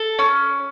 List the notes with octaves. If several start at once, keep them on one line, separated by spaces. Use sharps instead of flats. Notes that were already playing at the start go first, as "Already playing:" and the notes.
Already playing: A4
C#4